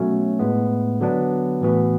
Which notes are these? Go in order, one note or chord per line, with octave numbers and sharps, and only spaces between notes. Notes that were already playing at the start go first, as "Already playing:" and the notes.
Already playing: B2 F#3 A3 C#4 F#4
A2 G#3 B3
D3 F#3 B3 D4
A2 E3 B3 F#4